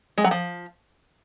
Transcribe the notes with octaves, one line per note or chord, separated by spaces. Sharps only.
G#3
F#3
F3